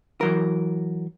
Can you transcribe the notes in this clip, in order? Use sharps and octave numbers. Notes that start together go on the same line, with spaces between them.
E3 F#3 A#4